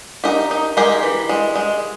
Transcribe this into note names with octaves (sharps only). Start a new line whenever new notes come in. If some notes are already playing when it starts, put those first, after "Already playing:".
D#4 G4 A#4
D#4
G#3 G4 A#4
E3
G#3
G#3